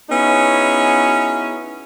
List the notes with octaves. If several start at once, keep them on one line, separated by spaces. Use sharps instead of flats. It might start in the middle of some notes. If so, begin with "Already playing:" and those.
B3 C#4 D#4 E4 F#4 G#4